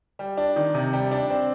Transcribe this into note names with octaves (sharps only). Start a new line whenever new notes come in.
G3
D4
D#3
C3
G3
D4
C4